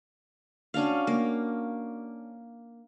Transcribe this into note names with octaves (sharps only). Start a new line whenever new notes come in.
C#4 D4 F#4 F5
A#3